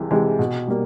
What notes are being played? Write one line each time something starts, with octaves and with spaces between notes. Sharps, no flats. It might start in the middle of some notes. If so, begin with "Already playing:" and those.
Already playing: C2 C3 E3 G#3
C3 E3 G#3
B2
G3 A#3